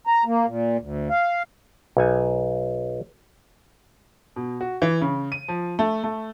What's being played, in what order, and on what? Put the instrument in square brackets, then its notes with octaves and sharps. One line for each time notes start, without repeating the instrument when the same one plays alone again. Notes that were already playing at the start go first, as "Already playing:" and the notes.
[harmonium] A#5
A#3
A#2
D2
F5
[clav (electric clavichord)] B1 C#5 G#5
[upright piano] B2
F#4
E3
C#3
D#7
F3
A3
A3